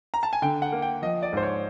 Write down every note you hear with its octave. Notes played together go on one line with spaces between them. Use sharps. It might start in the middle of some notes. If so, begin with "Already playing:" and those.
A#5
A5
G#5
D3 G5
F#5
A#3
G5
F3 D#5
D5
G#2 C5
C#5